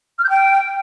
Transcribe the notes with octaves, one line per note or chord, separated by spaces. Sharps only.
F6
G6
G5